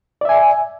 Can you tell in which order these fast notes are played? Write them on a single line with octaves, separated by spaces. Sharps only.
D5 E5 G#5